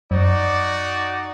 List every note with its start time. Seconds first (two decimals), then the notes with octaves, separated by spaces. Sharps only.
0.11 F#2 D#4 F#4 D5